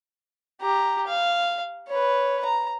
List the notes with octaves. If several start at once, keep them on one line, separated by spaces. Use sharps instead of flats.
G4 A#5
F5
B4 C#5
A#5